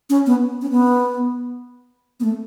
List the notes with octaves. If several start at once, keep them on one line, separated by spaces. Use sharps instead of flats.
C#4
B3
C#4
B3
B3
A3